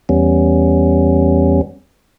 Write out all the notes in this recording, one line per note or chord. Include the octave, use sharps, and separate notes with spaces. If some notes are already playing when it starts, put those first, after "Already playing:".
E2 G3 B3 C#4